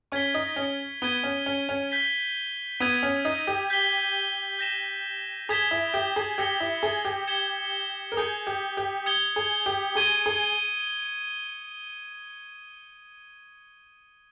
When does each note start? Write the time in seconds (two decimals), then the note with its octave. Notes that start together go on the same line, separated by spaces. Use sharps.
0.12 C#4 C#6 G#6 B6 G7
0.34 D#4
0.56 C#4
1.02 B3 G#6 D#7 G7
1.24 C#4
1.46 C#4
1.69 C#4
1.92 G6 B6 G7
2.80 B3 E6 G#6 D#7
3.03 C#4
3.25 D#4
3.47 G4
3.70 G6 B6 G7
4.59 G6 A#6 E7
5.49 G#4 D#6 G#6 B6 E7 G7
5.71 E4
5.94 G4
6.16 G#4
6.38 G4 E6 A#6 C#7 G7
6.60 E4
6.83 G#4
7.05 G4
7.27 G#6 C#7 E7 G7
8.12 A#4
8.17 G#4 D#6 G6 C#7
8.47 G4
8.77 G4
9.06 D#6 G#6 C#7 G7
9.36 G#4
9.66 G4
9.95 G#4 C#6 G#6 D#7 G7
10.26 G#4